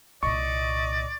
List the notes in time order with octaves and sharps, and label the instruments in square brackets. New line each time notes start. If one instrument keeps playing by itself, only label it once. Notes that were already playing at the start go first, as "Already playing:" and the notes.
[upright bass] C2 A#2 [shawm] D5 [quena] D#5 [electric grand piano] C#6